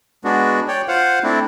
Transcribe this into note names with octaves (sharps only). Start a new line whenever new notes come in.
G#3 B3 D4 F#4
C#5 D5 G5
F4 C5 F5 F#5
A3 C4 D4 E4